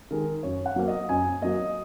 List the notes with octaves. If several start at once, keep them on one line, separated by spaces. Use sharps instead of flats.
D#3 G#3 A#4
F#2 C#5
F#5
F#3 A#3
D#5
F#2 G#5
F#3 A#3 D#5